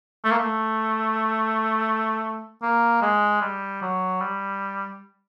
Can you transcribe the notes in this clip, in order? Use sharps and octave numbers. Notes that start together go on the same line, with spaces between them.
A3
A#3
A3
A#3
G#3
G3
F#3
G3